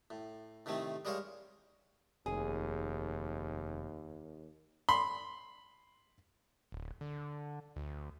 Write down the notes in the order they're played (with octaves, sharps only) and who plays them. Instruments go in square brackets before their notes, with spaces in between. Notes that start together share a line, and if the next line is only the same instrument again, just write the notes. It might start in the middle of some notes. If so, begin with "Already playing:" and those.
[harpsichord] A2
A2 C3 D#3 A3 C4
G3 G#3 A#4 C5 C#5 F5
[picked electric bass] F1 [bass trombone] D#2 [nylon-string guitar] G#4
[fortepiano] B5 C6
[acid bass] D1
D3
D2